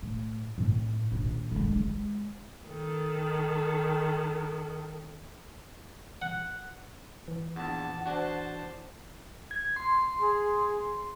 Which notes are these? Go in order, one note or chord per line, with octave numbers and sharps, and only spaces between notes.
A2
A2 C4
A#1 D#2
D3 G#3
G#3
D#3 A4
F#5
E3
A#1 E2 F#5 A5
D4 F#4 C5 A5
G#6
C6
G#4